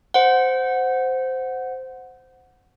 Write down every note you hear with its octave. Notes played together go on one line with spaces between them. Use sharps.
C5 F#5